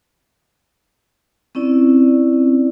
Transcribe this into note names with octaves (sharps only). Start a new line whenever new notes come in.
C4 C#4 E4 D5